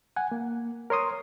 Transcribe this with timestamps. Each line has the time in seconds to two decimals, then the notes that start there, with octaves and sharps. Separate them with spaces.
0.16 F#5 G#5
0.32 A#3
0.90 A#4 C#5 C6 D#6